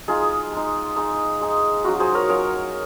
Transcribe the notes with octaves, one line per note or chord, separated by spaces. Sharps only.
G#3 D#4 F4 G#4
G#3 D#4
G#3 D#4
G#3 D#4
F#3 C#4 F4 F#4
G#4 C5
A#4 C#5
F#3 C#4 F4 A#4 C#5